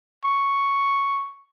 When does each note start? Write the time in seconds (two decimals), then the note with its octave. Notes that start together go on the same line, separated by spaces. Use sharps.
0.25 C#6